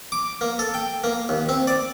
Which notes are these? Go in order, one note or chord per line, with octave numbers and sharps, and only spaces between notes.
D6
A#3
A4
G5
A#3
D#2
C4
D5